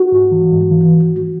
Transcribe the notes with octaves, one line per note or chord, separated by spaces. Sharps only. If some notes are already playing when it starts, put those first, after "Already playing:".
Already playing: F#4
G#2
E3
G#2
E3